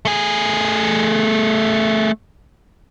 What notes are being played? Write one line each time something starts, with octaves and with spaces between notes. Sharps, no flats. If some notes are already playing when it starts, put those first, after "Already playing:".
A3 G#4